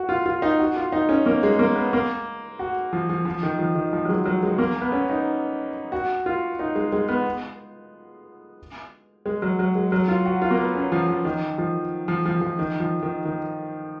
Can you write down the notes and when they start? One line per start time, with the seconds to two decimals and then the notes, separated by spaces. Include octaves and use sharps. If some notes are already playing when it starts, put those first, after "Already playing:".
Already playing: F#4
0.09 F4
0.26 F4
0.42 D#4
0.59 F#4
0.77 F4
0.92 D#4
1.09 C#4
1.26 A#3
1.43 G#3
1.59 A#3
1.76 B3
1.93 A#3
2.59 F#4
2.93 F3
3.09 F3
3.25 F3
3.43 D#3
3.59 F3
3.75 D#3
3.93 F3
4.05 F#3
4.09 G#3
4.25 F#3
4.43 G#3
4.58 A#3
4.82 B3
4.92 C#4
5.09 D#4
5.92 F#4
6.26 F4
6.59 D#4
6.75 G#3
6.92 G#3
7.08 B3
9.26 G#3
9.42 F#3
9.59 F#3
9.75 G#3
9.92 F#3
10.08 F4
10.26 F#4
10.42 F4
10.51 A#3
10.58 B3
10.75 C#4
10.92 F3
11.08 F3
11.25 D#3
11.58 F3
12.08 F3
12.25 F3
12.41 F3
12.59 D#3
12.80 F3
13.02 D#3
13.25 D#3